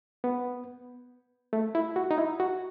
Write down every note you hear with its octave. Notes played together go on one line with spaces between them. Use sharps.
B3
A3
E4
F#4
D#4
E4
F#4